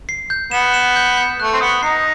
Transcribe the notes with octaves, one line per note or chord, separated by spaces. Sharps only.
C7
G6
B3 E7
E7
G6
G6
A3 F#6
C4
B3 D#6
D#4 C7